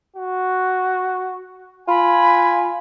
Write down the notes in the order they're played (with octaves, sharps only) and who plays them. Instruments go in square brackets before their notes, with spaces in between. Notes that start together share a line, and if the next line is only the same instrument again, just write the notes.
[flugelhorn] F#4
[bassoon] F4 [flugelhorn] G#5 [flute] B5